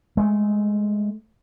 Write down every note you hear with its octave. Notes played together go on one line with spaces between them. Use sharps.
G#3 A3